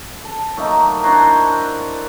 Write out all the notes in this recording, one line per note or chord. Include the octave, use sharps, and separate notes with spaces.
A4
F#3 A3 A#3 D#4
D4 E4 F#4 C5